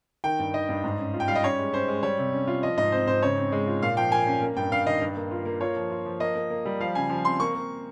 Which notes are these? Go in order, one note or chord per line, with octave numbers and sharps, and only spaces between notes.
D#3 G5
G2
D#3 D#5
G2
G#2
C#4
F4
G5
G3 F5
D#5
C#4 C#5
G#3
C#4 C5
G#3
G3 C#5
C3
C#4
F4
F3 D#5
G#2 D#5
C4 C5
G#2 C5
C#3 C#5
C4
G#3
F4
A#2 F5
F3 G5
A#3 G#5
C#4
A#3
G2 G5
G2 F5
D#3 D#5
G2
A#3
F4
A#3
F4 C#5
F3
F4
F3
A#3 D#5
A#3
A#3
G3
F3 F5
C#3 G#5
F3
C4 C6
A#3 C#6
A#3